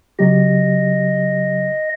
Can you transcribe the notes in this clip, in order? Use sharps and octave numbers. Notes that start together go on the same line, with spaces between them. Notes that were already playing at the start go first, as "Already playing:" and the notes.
C#3 F#3 G4 D#5